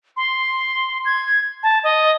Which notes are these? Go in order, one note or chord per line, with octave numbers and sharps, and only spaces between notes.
C6
G#6
A5
D#5